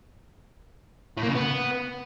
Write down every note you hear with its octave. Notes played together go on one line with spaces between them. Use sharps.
A2
A#3
C#3
B3